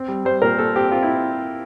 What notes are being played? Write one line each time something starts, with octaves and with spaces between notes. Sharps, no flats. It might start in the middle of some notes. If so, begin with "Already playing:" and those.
Already playing: C4
G3
G3 C5
A#2 A#4
A#2 A4
C4 G4
C4 F4
E4